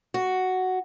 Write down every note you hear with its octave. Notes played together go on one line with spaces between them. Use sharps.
F#4